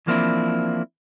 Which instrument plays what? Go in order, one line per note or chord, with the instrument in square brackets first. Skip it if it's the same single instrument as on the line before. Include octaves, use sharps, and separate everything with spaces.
[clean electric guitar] E3 F3 A#3 C4 D4 E4